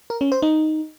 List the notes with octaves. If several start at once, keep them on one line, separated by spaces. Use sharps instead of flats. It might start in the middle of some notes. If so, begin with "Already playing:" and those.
A#4
C#4
C5
D#4